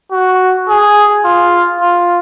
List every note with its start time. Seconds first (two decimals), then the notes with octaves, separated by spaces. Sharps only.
0.12 F#4
0.69 G#4
1.25 F4
1.81 F4